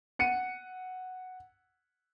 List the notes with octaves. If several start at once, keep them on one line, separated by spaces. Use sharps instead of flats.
F#5 C#7 D#7